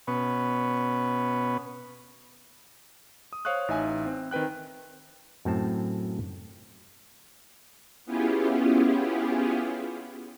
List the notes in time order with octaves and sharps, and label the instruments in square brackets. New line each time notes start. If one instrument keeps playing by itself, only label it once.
[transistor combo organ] B2 B3 C#4
[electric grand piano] D#6
C5 C#5 F5 C#6 D#6 F#6
A1 D#4 E5 G#5
C4
D#3 C4 B4 G5 F#6
[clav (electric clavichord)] F#2 A2 C4 A5
[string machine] B3 C#4 E4 F4 G4 G#4